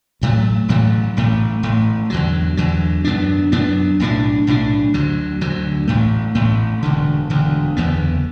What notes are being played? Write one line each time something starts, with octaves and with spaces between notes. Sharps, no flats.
A1 A2 F#3 A3
A1 A2 F#3 A3
A1 A2 A3
A1 A2 A3
E2 D3 F#3
E2 D3 F#3
F#2 F#3 B3 D4
F#2 F#3 B3 D4
B1 A2 E3 D4
B1 A2 E3 D4
D2 D3 F#3
D2 D3 F#3
A1 A2 A3
A1 A2 A3
E1 D2 D3
E1 D2 D3
F#1 E2 D3 B3